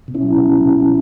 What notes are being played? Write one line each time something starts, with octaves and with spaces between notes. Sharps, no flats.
B2
C#4 E4
F#3
B2
F#3
B2
F#3